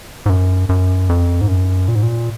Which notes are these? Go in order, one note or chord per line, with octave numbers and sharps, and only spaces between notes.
G#2
F#2
F#2
F2
G#2
F#2
A#2
G#2
A#2